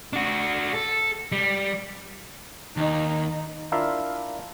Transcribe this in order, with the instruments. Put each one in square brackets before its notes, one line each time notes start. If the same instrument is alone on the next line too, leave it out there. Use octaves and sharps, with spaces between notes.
[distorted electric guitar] D4 F#4
A4
G3
[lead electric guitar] D#2 [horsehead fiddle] D#4
[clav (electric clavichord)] D4 E4 F4 A#4 E5 F5